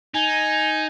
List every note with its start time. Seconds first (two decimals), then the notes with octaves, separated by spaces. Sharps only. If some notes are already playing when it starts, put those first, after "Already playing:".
0.14 D#4 G#5